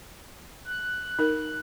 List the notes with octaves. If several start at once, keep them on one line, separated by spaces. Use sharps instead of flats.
F#6
D#4 A#4